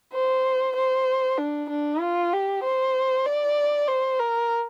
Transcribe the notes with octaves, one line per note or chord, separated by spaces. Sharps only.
C5
C5
D4
D4
F4
G4
C5
D5
C5
A#4